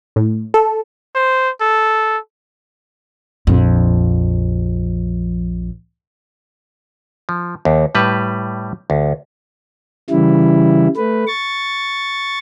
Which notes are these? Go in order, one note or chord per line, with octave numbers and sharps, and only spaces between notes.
A2
A4
C5
A4
A#1 F2
F3
D#2
A2 G3 B4
D2
C#3 E3 G3 E4
A3 B4
C#6 A6